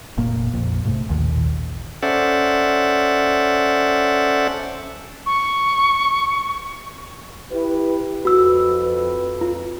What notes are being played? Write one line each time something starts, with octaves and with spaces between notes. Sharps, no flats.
F1 A#2 A#3
A#1 F2
G#2 C3 A3
A1 D#2 A#2 D#3
C#4 A4 C5 D5 E5 F#5
C#6
E4 G4 B4
F2 F#4 B4 E6
F4